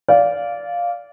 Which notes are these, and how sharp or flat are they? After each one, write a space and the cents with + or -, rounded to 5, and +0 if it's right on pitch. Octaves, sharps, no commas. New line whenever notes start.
D5 -20 F5 +0